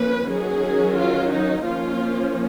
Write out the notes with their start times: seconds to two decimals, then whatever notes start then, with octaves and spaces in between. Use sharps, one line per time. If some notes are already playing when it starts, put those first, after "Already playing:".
Already playing: F3 A#3 C#4 B4
0.29 D#3 F#3 C#4 G#4
0.97 F4
1.31 D#4
1.64 F3 A#3 C#4 F4